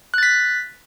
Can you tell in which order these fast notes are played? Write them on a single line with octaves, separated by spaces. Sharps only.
F#6 A6 B6